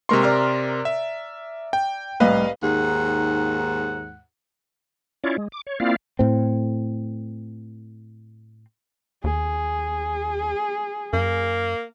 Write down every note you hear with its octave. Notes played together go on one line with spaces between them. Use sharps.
C3 G#3 A#4 C6 C#6
D5 A#5 F6
E5
G5
C2 A2 B4 D#5 F5
D#2 G#2 F#5
C#4 E4 F4 C#5 D5
G#3
D6
C#5
A#3 C4 E4 F4 D5 F5
A2 C4
D#2 G#4
F#2 A#3